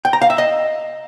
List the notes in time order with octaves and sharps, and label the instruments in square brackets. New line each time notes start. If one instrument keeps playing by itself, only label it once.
[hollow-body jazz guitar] G5
A#5
F5
E5
D#5